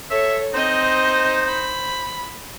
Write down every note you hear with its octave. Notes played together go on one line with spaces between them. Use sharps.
A4 C#5 E5
C4 D#4 C5 D#5
B5